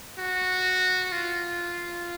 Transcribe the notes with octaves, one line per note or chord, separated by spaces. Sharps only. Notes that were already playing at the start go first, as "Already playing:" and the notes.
F#4
F4